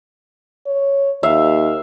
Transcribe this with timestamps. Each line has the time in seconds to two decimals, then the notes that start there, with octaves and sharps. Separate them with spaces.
0.66 C#5
1.23 D#2 E5 F5